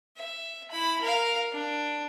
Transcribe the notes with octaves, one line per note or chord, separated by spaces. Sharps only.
E5
E4 B5
A#4 F5
D4